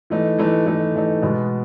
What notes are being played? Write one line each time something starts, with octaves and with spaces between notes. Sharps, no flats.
E3 A3 D#4
E3 A3 D#4
E3 A3 D#4
E3 A3 D#4
B2 G#3 B3